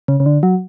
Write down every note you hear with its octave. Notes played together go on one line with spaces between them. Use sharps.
C#3
C#3
D3
F#3